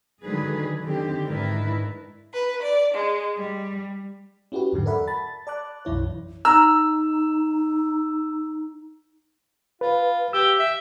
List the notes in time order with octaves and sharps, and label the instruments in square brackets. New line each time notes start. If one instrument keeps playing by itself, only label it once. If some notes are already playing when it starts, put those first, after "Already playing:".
[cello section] D3 D#3 F#3 G#3 G#4 B4
D3 D#3 C4 G4
G#2 D#3 D4 E4 A#4 B4
[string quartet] B4
D5
G#3
G3
[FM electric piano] C#4 E4 F#4 G4 B4
E2 G#2 D3 F#3
A4 A#4 D5 E5 F#5 B5
A5 B5 A6
D5 A5 D6 F#6
B1 F#2 E3 E4 C#5
[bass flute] D#4 [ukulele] A#5 [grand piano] E6
[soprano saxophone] F4 [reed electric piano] B4
[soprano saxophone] G4 [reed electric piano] E6
[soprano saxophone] E5